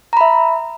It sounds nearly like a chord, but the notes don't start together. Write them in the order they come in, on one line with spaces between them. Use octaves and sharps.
A#5 B5 E5